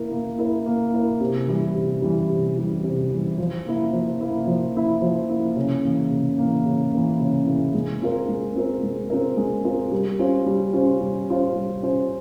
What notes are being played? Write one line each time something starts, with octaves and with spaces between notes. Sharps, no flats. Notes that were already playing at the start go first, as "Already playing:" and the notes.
Already playing: A#3 E4 A#4
A#3
E4 A#4
A#3
E4 A#4
C3
E3 G3
C3
E3 G3
C3
E3 G3
C3
E3 G3
F3
A#3 E4
F3
A#3 E4
F3
A#3 E4
F3
A#3 E4
C#3
E3 A#3
C#3
E3 A#3
C#3
E3 A#3
C#3
E3 A#3
G#3
C4 F4 A#4
G#3
C4 F4 A#4
G#3
C4 F4 A#4
G#3
C4 F4 A#4
G3
C#4 F4 C5
G3
C#4 F4 C5
G3
C#4 F4 C5
G3
C#4 F4 C5